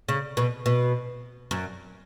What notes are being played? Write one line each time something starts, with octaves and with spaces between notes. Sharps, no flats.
C#3
B2
B2
F#2